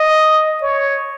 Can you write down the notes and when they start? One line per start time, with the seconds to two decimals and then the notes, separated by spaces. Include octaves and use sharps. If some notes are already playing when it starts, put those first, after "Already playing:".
Already playing: D#5
0.62 C#5